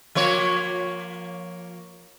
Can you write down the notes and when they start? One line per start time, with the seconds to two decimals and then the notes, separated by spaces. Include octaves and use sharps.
0.15 F3 A#3 C#5